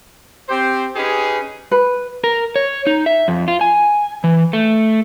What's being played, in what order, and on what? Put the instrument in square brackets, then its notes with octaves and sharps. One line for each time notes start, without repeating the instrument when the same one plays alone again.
[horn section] C4 G4 C5
C#4 D#4 G4 G#4 B4
[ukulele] B4
[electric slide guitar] A#4
C#5
D#4
E5
F2
F4
G#5
E3
A3